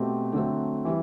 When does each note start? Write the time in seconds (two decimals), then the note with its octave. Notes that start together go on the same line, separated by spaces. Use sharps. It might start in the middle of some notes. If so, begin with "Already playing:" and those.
Already playing: B2 A3 C4 G4
0.33 D3 F#3 A3 C4
0.85 E3 G3